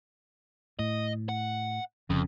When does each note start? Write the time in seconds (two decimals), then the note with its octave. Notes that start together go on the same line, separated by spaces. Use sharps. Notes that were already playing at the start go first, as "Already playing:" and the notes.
0.79 A2 D#5
1.29 F#5
2.10 F1 F2 C#3